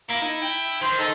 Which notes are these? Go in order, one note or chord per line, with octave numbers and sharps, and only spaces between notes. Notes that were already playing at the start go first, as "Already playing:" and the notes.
A#3 E4
D#4
G5
D#3 C5
D#4 A4